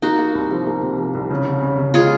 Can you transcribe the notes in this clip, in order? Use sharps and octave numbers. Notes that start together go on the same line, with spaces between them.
A#3 D#4 F#4
A#3
C2
F3
A#3
C3
F3
C2
C#3
C#3
C#3
C#3
G#3 F4 G#4